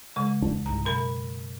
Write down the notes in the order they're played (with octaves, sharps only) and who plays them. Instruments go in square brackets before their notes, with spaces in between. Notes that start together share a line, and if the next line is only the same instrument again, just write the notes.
[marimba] C#3 G#3
[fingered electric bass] D1 E2 D4
[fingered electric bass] C2 G#2 [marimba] A#5
[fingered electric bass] F#2 [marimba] B2 A#4 B5